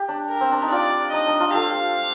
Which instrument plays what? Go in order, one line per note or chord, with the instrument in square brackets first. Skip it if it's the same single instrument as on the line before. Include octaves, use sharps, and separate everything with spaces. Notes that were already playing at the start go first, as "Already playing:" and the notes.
Already playing: [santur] G4
D4
[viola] A#4
[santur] C4
D4
D#4
[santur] D4 F4 [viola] D5
[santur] D#4 [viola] D#5
[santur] D4
D4 F4
[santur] F4 G4 A4 [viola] F5